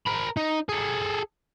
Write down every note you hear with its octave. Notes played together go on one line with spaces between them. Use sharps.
A#4 B5
D#4
G#4 A4